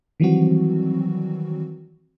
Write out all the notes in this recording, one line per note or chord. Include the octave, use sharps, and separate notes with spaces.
D#3 E3 F#3 G3 C4 F#4